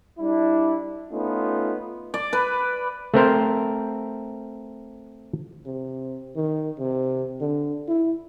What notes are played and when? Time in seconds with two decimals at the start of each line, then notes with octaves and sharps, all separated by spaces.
0.19 G3 D4 E4
1.10 A3 B3 C#4 D#4 F4
2.14 D5
2.33 B4
3.14 A3 C4 A#4 C5
5.66 C3
6.36 D#3
6.79 C3
7.41 D3
7.88 E4